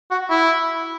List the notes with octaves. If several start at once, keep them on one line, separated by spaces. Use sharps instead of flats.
F#4
E4